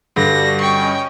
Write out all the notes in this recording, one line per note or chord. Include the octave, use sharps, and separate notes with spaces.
G2 D3 G3 F#4 A#6
C#4 D#5 G5 C#6